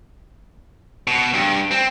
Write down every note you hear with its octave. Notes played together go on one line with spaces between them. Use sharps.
B2
G2
C4